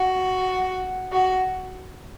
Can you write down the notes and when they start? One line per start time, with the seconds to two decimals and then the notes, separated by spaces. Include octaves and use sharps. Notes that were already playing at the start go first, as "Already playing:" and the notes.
Already playing: F#4
1.12 F#4